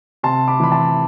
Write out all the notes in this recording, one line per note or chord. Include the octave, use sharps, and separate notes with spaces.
C3 A5 C6
B5 D6
E3 B5
A5 C6